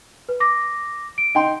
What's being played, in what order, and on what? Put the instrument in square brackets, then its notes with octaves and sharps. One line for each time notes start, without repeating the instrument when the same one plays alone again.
[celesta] B4
D6 A#6
D7
[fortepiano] D#4 G5 C6